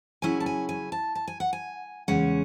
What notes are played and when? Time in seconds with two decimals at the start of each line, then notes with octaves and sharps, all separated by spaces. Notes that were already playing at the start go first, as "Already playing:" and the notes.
0.22 C#3 F#3 C#4 E4 G#5
0.40 A5
0.46 G#5
0.69 G#5
0.92 A5
1.15 A5
1.28 G#5
1.40 F#5
1.53 G#5
2.08 E2 C#3 G#3 C#4 F#5